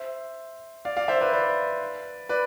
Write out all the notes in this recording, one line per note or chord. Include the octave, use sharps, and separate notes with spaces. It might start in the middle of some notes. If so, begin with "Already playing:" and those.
Already playing: C5 E5
D5 F5
D5 F5
C5 E5
B4 D5
B4 D5
B4 D5